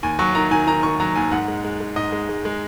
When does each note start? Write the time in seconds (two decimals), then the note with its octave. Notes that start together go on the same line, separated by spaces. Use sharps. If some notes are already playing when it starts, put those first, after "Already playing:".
0.03 D#2 G#5
0.19 F#3 C#6
0.35 D#3 A#5
0.51 D#3 G#5
0.67 D#3 A#5
0.83 D#3 C#6
1.00 F#3 A#5
1.16 D#2 G#5
1.31 G#2 F#5
1.48 G#3
1.64 G#3
1.80 G#3
1.96 G#2 D#5
2.12 G#3
2.29 G#3
2.45 G#3